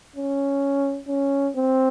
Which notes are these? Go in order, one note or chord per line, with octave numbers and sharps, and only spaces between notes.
C#4
C#4
C4